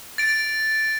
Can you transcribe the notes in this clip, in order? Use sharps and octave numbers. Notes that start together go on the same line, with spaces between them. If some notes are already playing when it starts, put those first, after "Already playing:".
A6 D7